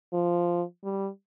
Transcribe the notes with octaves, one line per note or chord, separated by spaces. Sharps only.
F3
G3